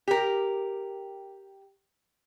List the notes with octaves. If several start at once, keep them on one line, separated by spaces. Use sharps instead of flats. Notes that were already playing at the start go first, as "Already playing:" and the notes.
G4 A#4